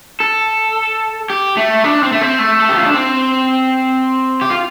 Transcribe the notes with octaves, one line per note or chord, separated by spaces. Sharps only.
A4
G4
A3
D4
C4
A3
C4
A3
A4
G4
F4
D4
C4
G4
F4